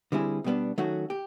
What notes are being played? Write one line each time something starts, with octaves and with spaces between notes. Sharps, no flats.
D3 G3 C4 E4 G#4
B2 G3 B3 D4
D#3 F#3 A3 C#4 F#4
G4